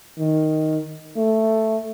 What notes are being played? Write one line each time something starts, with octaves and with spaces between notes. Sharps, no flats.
D#3
A3